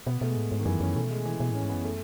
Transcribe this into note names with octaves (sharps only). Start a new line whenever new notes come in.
B2 B3
B2 A3
G#3
A2
G#2
D#3
F#2 E3
F#2 C#4
B2 A3
G#3
E3
B2
A2 C#4
G#2
F#2 B3
A3